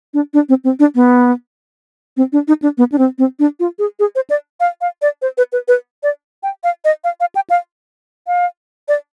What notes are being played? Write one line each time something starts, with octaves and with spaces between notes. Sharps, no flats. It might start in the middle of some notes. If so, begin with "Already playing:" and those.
D4
D4
C4
C4
D4
B3
C4
D4
D#4
D4
B3
D4
C4
C4
D4
F4
G#4
G#4
C5
D5
F5
F5
D5
C5
B4
B4
B4
D5
G5
F5
D#5
F5
F5
G5
F5
F5
D5